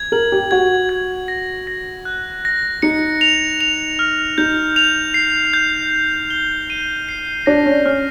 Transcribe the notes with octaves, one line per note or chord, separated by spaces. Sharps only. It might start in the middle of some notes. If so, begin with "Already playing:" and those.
Already playing: G#6
A#4 F#7
G4
F#4 G#6
G#6
A#6
A#6
F#6
A#6
D#4 C#7
F7
F7
F6
D#4 G6
F7
C7
G6
C7
G7
D#7
C7
D4 A#6
C#4
C#4 F6